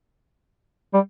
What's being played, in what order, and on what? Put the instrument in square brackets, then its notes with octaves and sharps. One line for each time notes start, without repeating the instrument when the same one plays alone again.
[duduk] G3